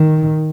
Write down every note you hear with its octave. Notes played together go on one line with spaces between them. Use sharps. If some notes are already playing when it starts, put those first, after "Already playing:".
Already playing: D#3